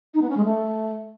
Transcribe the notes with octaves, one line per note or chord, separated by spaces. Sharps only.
D#4
B3
C#4
G#3
A3